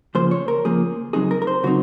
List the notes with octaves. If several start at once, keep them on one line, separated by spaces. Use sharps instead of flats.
C#3 F3 A#3 C5
C#5
A#4
C#3 F3 A#3 G#4
C#3 F#3 C4 D#4 G#4
A#4
A#4
C5
C#3 F#3 C4 D#4 F#4